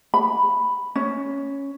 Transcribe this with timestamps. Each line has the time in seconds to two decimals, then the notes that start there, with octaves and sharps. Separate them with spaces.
0.14 B5
0.96 C#4